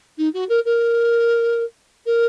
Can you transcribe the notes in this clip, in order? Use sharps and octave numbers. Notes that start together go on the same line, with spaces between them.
D#4
F#4
A#4
A#4
A#4